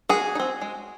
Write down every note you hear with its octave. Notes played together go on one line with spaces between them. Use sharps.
G#3 F#4 G#4
D#4
C4
G#3